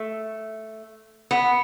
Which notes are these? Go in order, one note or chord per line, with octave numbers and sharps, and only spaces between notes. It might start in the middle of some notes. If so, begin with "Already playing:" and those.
Already playing: A3
B3